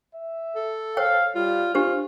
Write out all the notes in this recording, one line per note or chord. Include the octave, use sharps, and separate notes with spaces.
E5
A4
C5 C#5 F5 G5
G3 F4
D4 F4 G4 C5 F5